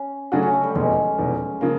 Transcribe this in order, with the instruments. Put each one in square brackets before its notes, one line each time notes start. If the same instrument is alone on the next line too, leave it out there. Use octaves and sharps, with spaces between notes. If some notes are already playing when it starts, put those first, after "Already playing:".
Already playing: [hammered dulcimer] C#4
[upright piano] C#3 F#3 A3 D4 F#4 [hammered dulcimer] C#4
[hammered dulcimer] C#4
A3
G3
[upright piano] F1 E2 B2 [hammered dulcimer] G#3
[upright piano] F1 E2 B2
C#3 F3 A#3